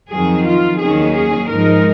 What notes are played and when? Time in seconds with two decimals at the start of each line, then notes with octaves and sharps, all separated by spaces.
0.11 F2 D#3 F#3 G#4
0.46 F4
0.80 D#2 D#3 F#3 C#4 G#4
1.14 G#4
1.48 G#2 F3 G#3 D#4 A#4